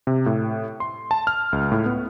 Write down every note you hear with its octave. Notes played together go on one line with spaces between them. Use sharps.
C3
A2
C6
A5
F6
C#2
A2
B3